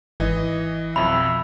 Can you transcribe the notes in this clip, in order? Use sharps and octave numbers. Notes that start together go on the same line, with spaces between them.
G#1 E3 D#5
B1 F2 E5 B5